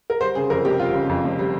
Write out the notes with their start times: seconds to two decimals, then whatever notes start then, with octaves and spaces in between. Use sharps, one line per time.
0.10 A#4
0.21 G3 C5
0.35 C#3 G#4
0.50 F2 A#4
0.65 F1 G4
0.80 G3 F4
0.95 C#3
1.09 F2
1.25 F1
1.39 G3